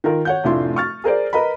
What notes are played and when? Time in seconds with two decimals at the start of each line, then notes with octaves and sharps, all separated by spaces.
0.04 D#3 F4 A#4
0.25 C#5 F#5 G6
0.44 F1 A2 D4 E4 F4 C6
0.76 C#6 F6 A6
1.04 G#4 A#4 C5 D5
1.33 A#4 B4 D#5 A#5 B5